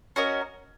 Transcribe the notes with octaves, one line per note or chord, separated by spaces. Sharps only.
C#4 F#4 A#4 D#5